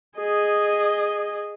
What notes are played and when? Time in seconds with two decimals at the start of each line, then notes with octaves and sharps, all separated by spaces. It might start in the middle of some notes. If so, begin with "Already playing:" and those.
0.17 G#4 D#5